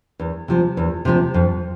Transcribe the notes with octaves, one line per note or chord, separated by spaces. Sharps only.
E2
C3 F3 C4
E2
C3 F3 C4
F2